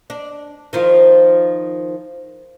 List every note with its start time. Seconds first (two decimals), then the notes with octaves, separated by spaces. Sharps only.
0.10 D4
0.73 D#3 F3 F4